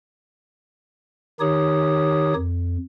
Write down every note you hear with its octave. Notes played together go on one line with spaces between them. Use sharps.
D#3 D#4 G4 C#5 D#6
F2